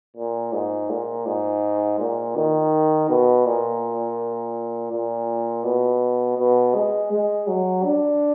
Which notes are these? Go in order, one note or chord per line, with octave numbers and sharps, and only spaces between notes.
A#2
G#2
A#2
G#2
A#2
D#3
B2
A#2
A#2
B2
B2
G#3
G#3
F#3
D4